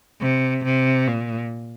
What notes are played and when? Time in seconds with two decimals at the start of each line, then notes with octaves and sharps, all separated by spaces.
0.21 C3
0.64 C3
1.08 A#2